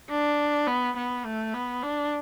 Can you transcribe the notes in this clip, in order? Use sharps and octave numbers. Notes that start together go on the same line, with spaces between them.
D4
B3
B3
A3
B3
D4